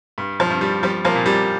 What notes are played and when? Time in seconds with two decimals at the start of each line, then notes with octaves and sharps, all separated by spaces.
0.18 G2
0.40 F3
0.50 G2
0.61 G3
0.83 F3 G3
1.05 F3 A#3
1.15 A#2
1.26 G3